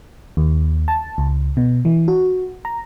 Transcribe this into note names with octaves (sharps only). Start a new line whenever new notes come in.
D#2
A5
C#2
B2
E3
F#4
A#5